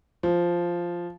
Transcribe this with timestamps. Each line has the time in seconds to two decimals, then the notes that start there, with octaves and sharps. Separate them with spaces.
0.23 F3